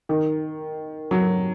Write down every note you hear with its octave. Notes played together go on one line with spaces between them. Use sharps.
D#3
F#3